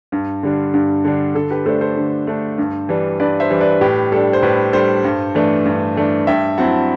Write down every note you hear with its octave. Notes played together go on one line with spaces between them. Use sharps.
G2
D3 G3 D4
G2
D3 G3 D4
D3 A4
G4 B4
A3 D4 A4 C5
A4 C5
D3
A3 D4
G2
E3 G3 D4
G2 B4 D5
C5 E5
E3 G3 D4
B4 D5
A2 G4 B4
G3 D4 A4
C5
A2 G4 B4
G3 D4 A4 C5
G2
E3 A3 D4
G2
E3 A3 D4
G2 E5 G5
F#3 C4 E4 F#5 A5